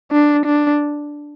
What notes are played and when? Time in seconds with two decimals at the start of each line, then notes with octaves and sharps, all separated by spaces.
0.12 D4
0.46 D4